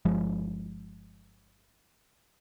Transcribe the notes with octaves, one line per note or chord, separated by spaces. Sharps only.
G1 F3 G#3